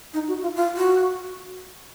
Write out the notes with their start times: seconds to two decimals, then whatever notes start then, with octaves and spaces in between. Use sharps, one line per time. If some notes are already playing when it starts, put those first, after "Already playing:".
0.14 D#4
0.28 F#4
0.42 F4
0.55 F4
0.77 F#4